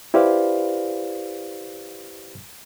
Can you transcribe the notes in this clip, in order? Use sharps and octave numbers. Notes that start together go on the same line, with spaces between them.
E4 G4 B4 C5 D5 F5